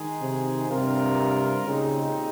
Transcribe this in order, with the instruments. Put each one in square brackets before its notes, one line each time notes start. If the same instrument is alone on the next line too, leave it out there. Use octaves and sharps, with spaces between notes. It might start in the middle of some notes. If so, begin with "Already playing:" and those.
Already playing: [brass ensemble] D#3 G#3 D#4 G#4
[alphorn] C3
[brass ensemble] G2 G3 C4 F4 A#4 [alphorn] C3
[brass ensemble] A#2 G#3 C4 D#4 G4 [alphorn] C#3